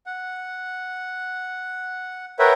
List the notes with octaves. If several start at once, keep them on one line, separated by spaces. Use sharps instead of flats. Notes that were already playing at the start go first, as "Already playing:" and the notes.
F#5
A#4 B4 C#5 E5 F#5 G5